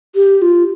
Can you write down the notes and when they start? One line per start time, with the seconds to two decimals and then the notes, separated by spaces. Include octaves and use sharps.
0.15 G4
0.42 F4